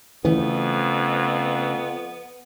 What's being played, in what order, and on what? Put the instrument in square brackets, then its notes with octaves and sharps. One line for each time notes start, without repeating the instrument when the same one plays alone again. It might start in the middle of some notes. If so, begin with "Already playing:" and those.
[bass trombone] F2 [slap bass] C#3 A3 [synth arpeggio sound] E3 [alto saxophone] B3